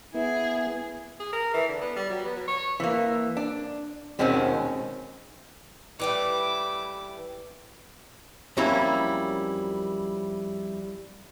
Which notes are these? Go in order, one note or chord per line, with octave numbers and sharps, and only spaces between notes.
B3 E4 G#4
G#4
A#4
E3
D3
B3
G3
F#3
B3
F#3
C#5
E3 A#3
D4
D#2 B2 D#3 G#3 C4 C#4
E3 G3 A3 E4 D6
F2 F#3 G3 A#3 C#4 E4